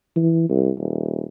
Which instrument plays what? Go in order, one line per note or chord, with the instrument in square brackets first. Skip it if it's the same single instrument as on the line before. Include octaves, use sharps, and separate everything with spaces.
[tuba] E3
C2
D#1